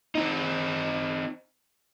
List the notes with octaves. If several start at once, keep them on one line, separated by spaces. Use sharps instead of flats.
C4 D#4